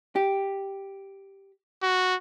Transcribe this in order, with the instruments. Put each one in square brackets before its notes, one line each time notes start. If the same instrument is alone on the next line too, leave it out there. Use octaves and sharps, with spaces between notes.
[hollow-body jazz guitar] G4
[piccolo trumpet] F#4